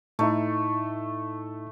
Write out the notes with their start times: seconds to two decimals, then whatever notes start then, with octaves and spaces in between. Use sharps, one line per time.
0.19 A2 A3 D#4 E4